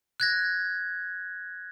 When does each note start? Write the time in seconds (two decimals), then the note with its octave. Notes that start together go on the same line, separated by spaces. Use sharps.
0.20 F#6 G#6 A#6